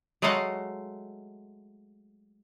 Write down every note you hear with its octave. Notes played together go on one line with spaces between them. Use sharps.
F#3 G#3 A3 D#5 F5 F#5